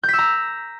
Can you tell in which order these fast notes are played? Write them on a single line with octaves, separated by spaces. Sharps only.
G6 B6 E6 A#5